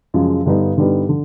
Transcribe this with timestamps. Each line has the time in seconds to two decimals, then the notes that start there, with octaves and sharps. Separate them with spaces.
0.14 F#2 C#3 F3 G#3
0.46 G2 D3 G3 B3 D#4
0.77 G2 D3 G3 B3 D#4
1.09 D3